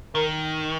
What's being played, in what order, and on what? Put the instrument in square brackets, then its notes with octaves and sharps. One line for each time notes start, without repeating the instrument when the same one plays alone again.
[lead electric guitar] D#3 [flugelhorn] A#4